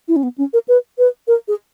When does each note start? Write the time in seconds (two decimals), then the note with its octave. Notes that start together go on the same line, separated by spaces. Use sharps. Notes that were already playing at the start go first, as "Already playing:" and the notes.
0.08 E4
0.16 C#4
0.23 B3
0.38 C#4
0.53 A#4
0.68 B4
0.98 B4
1.28 A#4
1.48 G#4